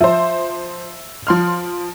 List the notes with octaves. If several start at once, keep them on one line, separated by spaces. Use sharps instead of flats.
F3 C5 E5
F3 C6 F6